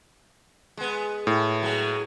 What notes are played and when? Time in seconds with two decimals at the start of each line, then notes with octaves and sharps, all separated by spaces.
0.77 G#3 B3
1.27 A2
1.63 F#3 G#3 G#4